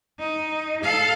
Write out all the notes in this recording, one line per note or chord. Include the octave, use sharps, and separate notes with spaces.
D#4
A4 F5